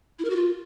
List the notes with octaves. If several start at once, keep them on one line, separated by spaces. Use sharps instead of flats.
E4
A#4
F#4
F4